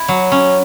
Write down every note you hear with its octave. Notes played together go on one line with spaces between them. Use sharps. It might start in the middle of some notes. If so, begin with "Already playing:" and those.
Already playing: E4
F#3
C#4